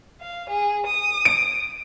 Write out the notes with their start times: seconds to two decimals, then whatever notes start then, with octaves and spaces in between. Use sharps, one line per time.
0.21 F5
0.50 G#4
0.87 D#6
1.25 D7